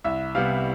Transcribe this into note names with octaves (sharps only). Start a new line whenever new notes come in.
C2 E5
C3 G3 B3 F5